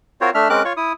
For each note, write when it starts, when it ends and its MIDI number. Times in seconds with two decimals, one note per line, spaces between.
0.21 0.30 60
0.21 0.30 65
0.21 0.30 66
0.21 0.30 70
0.21 0.30 72
0.21 0.30 73
0.34 0.48 57
0.34 0.48 62
0.34 0.48 76
0.34 0.48 89
0.50 0.63 56
0.50 0.63 60
0.50 0.63 61
0.50 0.63 70
0.50 0.63 86
0.50 0.63 90
0.65 0.73 65
0.65 0.73 73
0.65 0.73 85
0.77 0.93 64
0.77 0.93 87